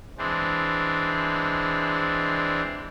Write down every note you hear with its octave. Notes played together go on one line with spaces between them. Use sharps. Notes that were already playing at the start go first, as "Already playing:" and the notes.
E3 G#3 C4 D4